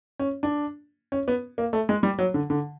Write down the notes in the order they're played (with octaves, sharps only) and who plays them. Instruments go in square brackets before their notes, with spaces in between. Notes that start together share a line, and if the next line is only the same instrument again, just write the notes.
[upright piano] C#4
D4
C#4
B3
A#3
A3
G#3
G3
F#3
D3
D3